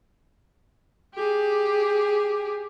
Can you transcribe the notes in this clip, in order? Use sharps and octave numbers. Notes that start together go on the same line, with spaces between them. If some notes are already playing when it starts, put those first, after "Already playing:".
G4 G#4